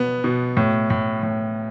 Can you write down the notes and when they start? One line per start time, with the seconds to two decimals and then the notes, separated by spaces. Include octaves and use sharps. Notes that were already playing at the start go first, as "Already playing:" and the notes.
Already playing: B2 B3
0.24 B2
0.57 A2
0.90 A2
1.23 A2